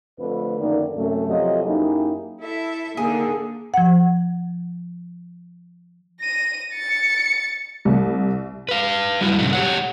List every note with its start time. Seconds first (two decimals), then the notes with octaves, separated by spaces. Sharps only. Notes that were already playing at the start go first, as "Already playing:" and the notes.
0.19 F2 D3 A3 B4
0.59 F#2 D3 D#3 F3 A#3 D5
0.97 F#2 C3 A3
1.28 C3 F3 F#3 F4 A4 D#5
1.65 F#2 A#3 D#4 E4 G4 G#4
2.40 E4 A4 E5
2.97 D3 D#3 A#3 G#4
3.74 F3 F#5
6.20 A#6 D#7
6.74 A6 C#7
7.85 C2
8.69 B4 F5
9.21 F#3 G3 E4 F#4
9.39 A#2 C#3 F#3 G3 F#4
9.53 G4 C#5 F#5